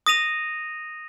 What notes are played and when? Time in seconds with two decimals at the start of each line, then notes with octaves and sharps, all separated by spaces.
0.06 D#6 A#6 D#7 F7